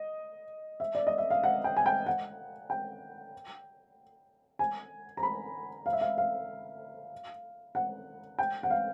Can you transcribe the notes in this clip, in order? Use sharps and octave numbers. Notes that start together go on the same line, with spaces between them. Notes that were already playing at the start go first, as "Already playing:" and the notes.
Already playing: D#5
E5
D5
D#5
E5
F5
F#5
G5
G#5
G5
F#5
G5
G#5
A#5
B5
F5
E5
F5
F5
F#5
G5
F#5
F5